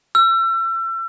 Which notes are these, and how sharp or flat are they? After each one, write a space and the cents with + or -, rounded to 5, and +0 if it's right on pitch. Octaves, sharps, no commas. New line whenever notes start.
E6 +35